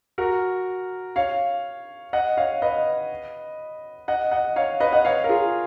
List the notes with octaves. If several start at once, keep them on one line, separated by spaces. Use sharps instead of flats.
F#4 A#4
C#5 F5
D#5 F#5
C#5 F5
B4 D#5
D#5 F#5
D#5 F#5
C#5 F5
B4 D#5
D#5 F#5
C#5 F5
A#4
F4 G#4